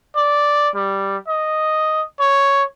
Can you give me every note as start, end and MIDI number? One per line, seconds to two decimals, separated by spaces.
0.16 0.69 74
0.75 1.17 55
1.28 2.02 75
2.20 2.64 73